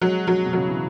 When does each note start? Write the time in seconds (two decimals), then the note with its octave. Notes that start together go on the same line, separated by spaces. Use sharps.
0.01 F#3 G#3
0.27 F#3
0.46 B2
0.53 C#3 F#3
0.68 E3